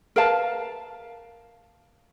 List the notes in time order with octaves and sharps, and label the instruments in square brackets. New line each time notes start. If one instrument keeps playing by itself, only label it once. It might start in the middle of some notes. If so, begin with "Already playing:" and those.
[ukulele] A#4 B4 F5 A5